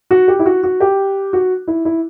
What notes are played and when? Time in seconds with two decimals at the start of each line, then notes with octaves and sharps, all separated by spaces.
0.11 F#4
0.28 G4
0.39 E4
0.46 F#4
0.63 F#4
0.80 G4
1.33 F#4
1.68 E4
1.85 E4